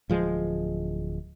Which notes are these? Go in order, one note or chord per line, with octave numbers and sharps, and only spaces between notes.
D1 F3 G#3